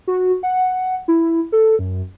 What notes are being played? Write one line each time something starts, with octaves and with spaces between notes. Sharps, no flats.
F#4
F#5
E4
A4
F#2